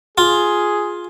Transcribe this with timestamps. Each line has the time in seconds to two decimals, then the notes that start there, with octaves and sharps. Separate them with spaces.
0.18 F4 G#4